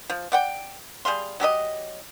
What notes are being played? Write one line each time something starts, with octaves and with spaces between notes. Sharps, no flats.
F3
D5 F#5 G5
G3 G#4 F5 C6
F#3 G4 A4 D#5